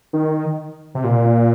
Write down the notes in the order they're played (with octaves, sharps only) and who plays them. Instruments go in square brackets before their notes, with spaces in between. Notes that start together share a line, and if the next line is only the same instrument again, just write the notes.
[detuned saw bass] D#3
C3
A#2